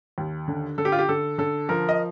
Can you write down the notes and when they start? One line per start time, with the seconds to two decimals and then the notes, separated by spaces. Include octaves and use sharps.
0.18 D#2
0.48 D3
0.78 D3 A4
0.85 G4
0.92 F4
0.99 G4
1.09 D3 A4
1.38 D3 A4
1.69 F3 A#4
1.89 D#5